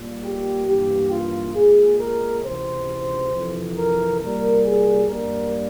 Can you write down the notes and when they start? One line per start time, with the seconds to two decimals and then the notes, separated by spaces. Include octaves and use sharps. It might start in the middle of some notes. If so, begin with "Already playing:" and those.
Already playing: A#2 G3 A#3
0.23 G4
0.66 G2 E3 A#3 G4
1.11 F4
1.55 A#2 G#3 G#4
1.99 A#4
2.43 C#2 C3 E3 C5
3.31 F2 C3 E3
3.76 A#4
4.20 C2 A#2 G3 A#3 A#4
4.64 G#4
5.08 G2 G3 A#3 A#4